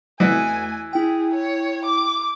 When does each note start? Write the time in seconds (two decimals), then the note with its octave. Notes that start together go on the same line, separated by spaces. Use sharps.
0.20 E2 E3 A3 F#4 D#5 G#5
0.93 E4 G#4 G5
1.34 C#5
1.85 D6